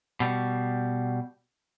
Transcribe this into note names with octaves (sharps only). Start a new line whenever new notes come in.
B2 G3